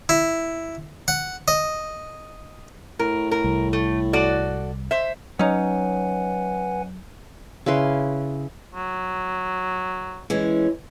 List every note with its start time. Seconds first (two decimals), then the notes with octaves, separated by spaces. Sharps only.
0.09 E4
1.08 F#5
1.48 D#5
2.99 A2 A#4
3.31 A#4
3.44 C2
3.73 A3
4.13 F#4 A4 D5
4.91 C5 E5
5.39 F#3 C#4 D#4 B4 F#5 G#5
7.66 C#3 E4 B4 C6
8.75 F#3
10.30 E3 G#3 C#4